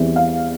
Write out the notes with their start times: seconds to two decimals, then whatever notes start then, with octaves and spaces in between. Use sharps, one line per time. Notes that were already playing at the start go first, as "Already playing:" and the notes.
Already playing: E2 E3 G3 C4
0.16 F5